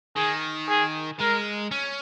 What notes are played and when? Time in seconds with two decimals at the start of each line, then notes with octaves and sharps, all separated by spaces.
0.16 D#3 G#4
0.68 G#4
1.19 G#3 A#4
1.71 C#4